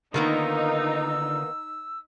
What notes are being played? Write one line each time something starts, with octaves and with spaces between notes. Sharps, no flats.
D3 D#3 A#3 B3 D#4 F4 A#4 E6